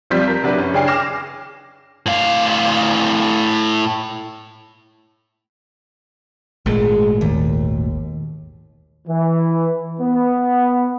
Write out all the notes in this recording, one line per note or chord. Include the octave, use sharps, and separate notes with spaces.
B1 F3 G3 C4 G6 B6
A#4
C3 F#3 D4 F#4 B4
F#2 C#4
C#3 D4 C#5 G5 G#5 C7
D6 F6 A#6 E7
A2 F5
G#1 A#2 G#3 A3
D#2
E3
B3